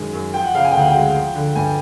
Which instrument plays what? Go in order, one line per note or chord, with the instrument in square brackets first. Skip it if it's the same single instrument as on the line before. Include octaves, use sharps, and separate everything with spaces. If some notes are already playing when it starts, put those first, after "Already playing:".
Already playing: [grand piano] F#2 D#3 G#3 G#5
F#2
F3 G5
F#5
C#3 F5
G#5
G5
D2 F#5
G5
G#3
F3
D3
G2 G#5